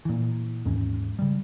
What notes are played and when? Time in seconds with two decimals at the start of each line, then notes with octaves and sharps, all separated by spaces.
0.05 A#2 E3
0.65 D#2 G#2 E3 C#4
1.19 C#3 G3